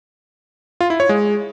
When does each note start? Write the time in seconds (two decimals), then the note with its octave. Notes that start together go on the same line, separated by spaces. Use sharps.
0.81 F4
0.90 E4
1.00 C#5
1.09 G#3